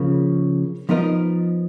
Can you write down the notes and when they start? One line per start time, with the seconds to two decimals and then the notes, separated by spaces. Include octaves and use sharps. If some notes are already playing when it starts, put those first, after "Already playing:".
Already playing: C#3 F3 A#3
0.89 F3 B3 D#4 A#4 D#5